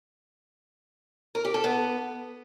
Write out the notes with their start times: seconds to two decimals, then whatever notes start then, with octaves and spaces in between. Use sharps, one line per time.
1.35 A#4
1.44 G4
1.54 A4
1.64 B3